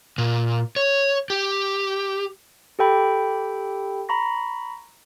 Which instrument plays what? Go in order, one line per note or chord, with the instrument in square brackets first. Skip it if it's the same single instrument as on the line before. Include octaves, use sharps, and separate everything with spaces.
[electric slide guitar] A#2
C#5
G4
[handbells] G4 A4 G5 B5
A#5 B5 C#6 A#6